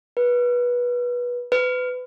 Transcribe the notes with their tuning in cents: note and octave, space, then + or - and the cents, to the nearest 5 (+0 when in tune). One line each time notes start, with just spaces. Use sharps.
B4 -20
B4 +30